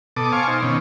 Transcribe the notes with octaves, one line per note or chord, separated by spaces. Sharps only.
B2 A4 D6 D#6
C5 F5 G#5 C#6 D6
D#4 C5
B2 D#3 C#4